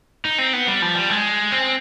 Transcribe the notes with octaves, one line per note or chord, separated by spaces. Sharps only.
D#4
C4
B3
G3
F3
G3
G#3
C4